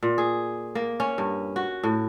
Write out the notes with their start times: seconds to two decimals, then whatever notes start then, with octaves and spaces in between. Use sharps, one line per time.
0.03 A#2
0.18 G#4
0.75 A#3
1.00 C#4
1.18 G2
1.56 F#4
1.83 A2